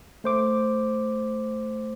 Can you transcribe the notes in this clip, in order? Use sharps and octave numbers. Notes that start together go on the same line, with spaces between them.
A3 C5 D6